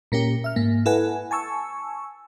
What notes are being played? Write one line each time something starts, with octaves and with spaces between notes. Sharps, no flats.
A#2 A#3 C#4 G4
E5 F6
G#2 A#3
E4 A4 B4 F#5 G#5
G#5 A5 C#6 E6